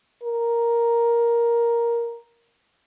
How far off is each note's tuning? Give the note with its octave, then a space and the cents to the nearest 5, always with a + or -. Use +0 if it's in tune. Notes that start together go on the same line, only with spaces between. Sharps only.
A#4 +5